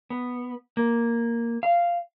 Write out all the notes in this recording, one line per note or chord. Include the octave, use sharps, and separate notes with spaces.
B3
A#3
F5